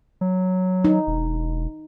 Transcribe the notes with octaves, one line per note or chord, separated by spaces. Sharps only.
F#3
D#4
E1